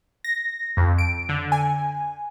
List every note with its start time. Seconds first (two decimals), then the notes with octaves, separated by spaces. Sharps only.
0.24 A#6
0.77 F2
0.98 D7
1.29 D3
1.52 G#5